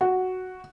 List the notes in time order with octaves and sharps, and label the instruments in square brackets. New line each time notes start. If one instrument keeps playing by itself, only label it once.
[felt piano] F#4